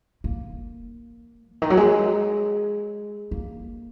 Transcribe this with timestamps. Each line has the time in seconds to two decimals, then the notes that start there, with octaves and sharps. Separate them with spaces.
0.24 A#3
1.54 C#3
1.62 D#3
1.70 F#3
1.77 G#3
3.31 A#3